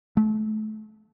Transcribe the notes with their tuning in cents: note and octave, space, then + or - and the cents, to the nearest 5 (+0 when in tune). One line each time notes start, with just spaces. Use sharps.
A3 -30